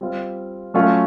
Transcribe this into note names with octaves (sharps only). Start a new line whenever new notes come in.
G3 C4 F4
F#3 A3 C#4 F4